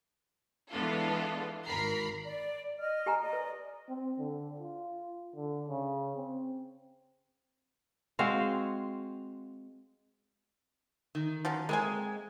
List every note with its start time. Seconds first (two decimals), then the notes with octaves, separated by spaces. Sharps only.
0.71 E3 G#3 B3 D4 F4 A4
1.66 G#1 A#4 A#5 B5 C7
2.24 D5
2.79 D#5 F6
3.06 G4 G#5 A#5
3.21 D5 D#5
3.33 B4
3.89 C4
4.19 D3
4.60 F4
5.36 D3
5.68 C#3
6.16 C4
8.19 G#3 C4 F#4 F5
11.15 D#3
11.45 F3 F#3 C#4
11.69 G#3 A#3 C4 G#5